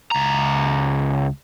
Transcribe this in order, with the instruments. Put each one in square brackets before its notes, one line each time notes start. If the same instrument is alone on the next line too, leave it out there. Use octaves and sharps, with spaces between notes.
[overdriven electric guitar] C#2 A#5